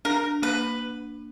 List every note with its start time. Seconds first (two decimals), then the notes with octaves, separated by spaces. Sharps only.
0.05 D4 A#4
0.42 A#3 B4